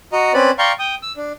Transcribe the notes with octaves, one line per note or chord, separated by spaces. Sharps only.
F#4 D#5 A#5
C4 C#4 B4 D5
D5 F5 G5 A#5 C6 C#6
G5 D#6
E6
D4